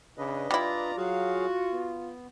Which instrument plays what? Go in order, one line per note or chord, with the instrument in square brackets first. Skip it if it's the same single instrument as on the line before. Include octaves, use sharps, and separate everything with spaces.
[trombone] C#3 [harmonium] D4 B4 D#5
[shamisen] G3 E4 [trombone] F4 [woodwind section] D5 A#5
[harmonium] F#3 G#4 F5 [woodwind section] F#4
[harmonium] B3